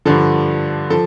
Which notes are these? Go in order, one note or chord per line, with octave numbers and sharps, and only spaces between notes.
G2 D3 F3 A4
F3 A4